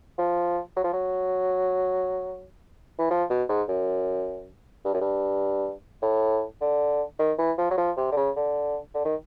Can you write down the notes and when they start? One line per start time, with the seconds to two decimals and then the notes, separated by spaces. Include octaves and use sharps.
0.18 F3
0.76 F#3
0.84 F3
0.93 F#3
2.99 E3
3.10 F3
3.30 B2
3.49 G#2
3.69 F#2
4.85 G2
4.94 F#2
5.01 G2
6.02 A2
6.61 D3
7.19 D#3
7.38 E3
7.58 F3
7.71 F#3
7.78 F3
7.97 C3
8.12 D3
8.17 C#3
8.36 D3
8.95 D3
9.05 D#3